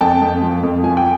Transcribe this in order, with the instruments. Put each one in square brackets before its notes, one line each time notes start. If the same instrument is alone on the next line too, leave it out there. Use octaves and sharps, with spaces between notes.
[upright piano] F2 G5 A5
F2
F3
F2
F3 G#5
G5